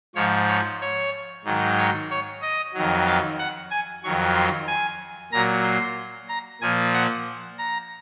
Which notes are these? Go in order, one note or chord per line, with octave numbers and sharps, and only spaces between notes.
G#2 F3 C#5
C#5
C#5
G#2 D#3 F#3
C#5
C#5
D#5
F2 D#3 F#3
F5
F#5
G#5
F2 D#3 F#3 C#6
C6
G#5
A#2 F#3 A#5
C6
A#5
A#2 F3 G#5
F#5
A#5